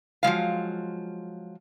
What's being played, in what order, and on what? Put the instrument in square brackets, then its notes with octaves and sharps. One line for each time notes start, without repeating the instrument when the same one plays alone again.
[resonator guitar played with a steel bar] F3 F#3 G#3 F5